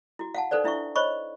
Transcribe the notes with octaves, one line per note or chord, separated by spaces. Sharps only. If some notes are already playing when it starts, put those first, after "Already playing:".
E4 F#4
F5 F#5 A5
D#4 A4 B4 C5 D5
D4 E4 E5 F5 C#6
C5 C#5 D#5 B5 C#6